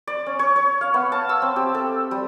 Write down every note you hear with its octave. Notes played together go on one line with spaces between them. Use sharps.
D5
C#4
C#5
C#5
F5
B3
A5
E6
C4
G4
A4
G3